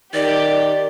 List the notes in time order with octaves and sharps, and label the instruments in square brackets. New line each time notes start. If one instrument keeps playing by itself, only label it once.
[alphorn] D#3 [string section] G4 [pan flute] D5